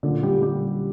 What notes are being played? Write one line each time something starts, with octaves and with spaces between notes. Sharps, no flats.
A#2 D3 F#3 D4
G3 G4
G3 G4